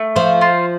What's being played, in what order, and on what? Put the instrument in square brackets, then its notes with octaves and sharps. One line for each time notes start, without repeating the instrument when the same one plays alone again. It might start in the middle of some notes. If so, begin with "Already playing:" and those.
Already playing: [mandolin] A3
[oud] F3 [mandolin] C5
[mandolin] F4